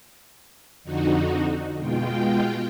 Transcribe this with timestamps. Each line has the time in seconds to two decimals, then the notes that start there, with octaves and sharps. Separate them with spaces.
0.84 F2 D3 D#4 F#4
1.78 B2 G#3 F4 G5